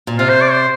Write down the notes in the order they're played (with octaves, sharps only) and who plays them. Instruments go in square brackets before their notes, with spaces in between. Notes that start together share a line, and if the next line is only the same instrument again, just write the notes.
[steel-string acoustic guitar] A#2
[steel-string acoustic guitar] C3 [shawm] F4
[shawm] C5
D5
C5